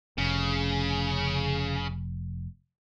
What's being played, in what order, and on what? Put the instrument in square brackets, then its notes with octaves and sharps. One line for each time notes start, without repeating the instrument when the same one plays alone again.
[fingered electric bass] F1 [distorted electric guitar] C#3